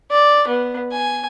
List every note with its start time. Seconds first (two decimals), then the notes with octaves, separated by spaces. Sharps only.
0.11 D5
0.47 B3
0.92 G#5